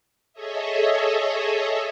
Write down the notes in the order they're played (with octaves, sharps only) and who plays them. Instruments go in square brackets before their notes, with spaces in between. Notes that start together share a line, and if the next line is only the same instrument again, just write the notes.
[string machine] G#4 A4 C#5 D#5 E5